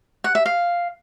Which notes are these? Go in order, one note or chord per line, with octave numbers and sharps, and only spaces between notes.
F#5
E5
F5